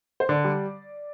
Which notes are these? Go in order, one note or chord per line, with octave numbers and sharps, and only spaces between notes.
C5
D3 D5
G3